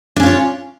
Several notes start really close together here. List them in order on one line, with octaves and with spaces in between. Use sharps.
D4 C#4 F4 C#5